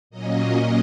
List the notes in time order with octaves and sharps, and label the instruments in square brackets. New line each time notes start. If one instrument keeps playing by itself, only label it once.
[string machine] A#2 F#3 A#3 C#4 D#5